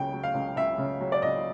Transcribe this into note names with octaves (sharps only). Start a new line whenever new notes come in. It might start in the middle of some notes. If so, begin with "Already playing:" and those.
Already playing: C#2 C#3 F#3 G5
F#3
F5
C#2
C#2 E5
C#3
F#3
D5
C#2 D#5